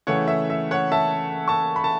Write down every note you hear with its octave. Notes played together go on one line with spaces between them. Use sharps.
C#3 E3 A3 C#5 F#5
E5
E5
C#5 F#5
E5 A5
A5 C#6
B5
A5